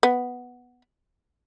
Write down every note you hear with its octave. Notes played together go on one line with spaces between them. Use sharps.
B3